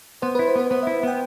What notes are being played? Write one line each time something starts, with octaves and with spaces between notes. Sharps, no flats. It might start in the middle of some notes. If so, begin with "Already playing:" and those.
B3 C5
E4 B4
C5
B3 B4
B3 C5
E4 E5
B3 G5